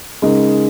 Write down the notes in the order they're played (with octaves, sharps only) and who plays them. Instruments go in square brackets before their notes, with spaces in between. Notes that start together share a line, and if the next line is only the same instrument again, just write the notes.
[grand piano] C#3 G#3 D#4 A#4